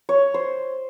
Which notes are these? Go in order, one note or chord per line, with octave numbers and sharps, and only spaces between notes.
C#5
C5